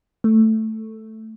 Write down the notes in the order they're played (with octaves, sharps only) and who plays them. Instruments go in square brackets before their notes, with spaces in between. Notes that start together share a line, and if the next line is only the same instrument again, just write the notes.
[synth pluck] A3